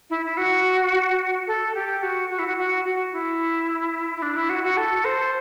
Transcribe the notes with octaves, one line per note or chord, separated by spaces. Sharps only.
E4
E4
F#4
A4
G4
F#4
F#4
E4
F#4
F#4
F#4
E4
E4
D4
E4
F#4
F#4
A4
C5